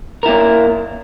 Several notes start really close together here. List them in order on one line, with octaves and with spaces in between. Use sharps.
A#4 E4 A#3